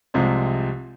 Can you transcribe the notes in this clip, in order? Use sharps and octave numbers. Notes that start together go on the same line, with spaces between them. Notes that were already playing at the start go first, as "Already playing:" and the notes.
C2 C3 F3 G#3 C4